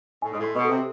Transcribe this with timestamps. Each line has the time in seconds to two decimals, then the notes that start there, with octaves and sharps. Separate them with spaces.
0.22 A2 G#5
0.32 G#2
0.39 A2 C6
0.54 B2
0.64 C3 A4